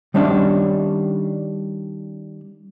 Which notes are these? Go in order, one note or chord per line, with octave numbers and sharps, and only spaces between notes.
D#3 G3 C#4 D4 E5